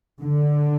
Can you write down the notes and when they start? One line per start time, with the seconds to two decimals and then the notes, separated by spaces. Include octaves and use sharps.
0.19 D3